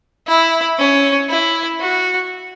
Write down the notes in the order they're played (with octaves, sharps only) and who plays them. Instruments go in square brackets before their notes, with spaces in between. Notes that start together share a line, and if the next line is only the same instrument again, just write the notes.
[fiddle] E4
C#4
E4
F#4